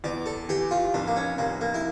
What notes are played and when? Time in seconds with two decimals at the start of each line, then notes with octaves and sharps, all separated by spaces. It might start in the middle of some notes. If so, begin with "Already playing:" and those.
0.04 E2 D5
0.26 A4
0.49 E3 G4
0.71 F4
0.94 F1 D4
1.08 A#3
1.16 C#4
1.38 F1 A#3
1.61 A#3
1.74 E4